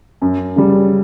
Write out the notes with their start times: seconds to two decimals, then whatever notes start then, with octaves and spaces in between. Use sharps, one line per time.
0.22 F#2
0.56 C#3 G3